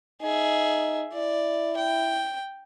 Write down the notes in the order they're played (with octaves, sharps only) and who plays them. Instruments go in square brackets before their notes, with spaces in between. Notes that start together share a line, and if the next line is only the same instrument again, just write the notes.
[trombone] D#4 [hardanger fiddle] G#4 E5
[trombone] E4 [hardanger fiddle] D5
[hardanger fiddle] G5